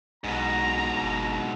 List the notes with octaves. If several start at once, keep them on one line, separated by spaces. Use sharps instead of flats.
B1 G#2 B2 A#5
G1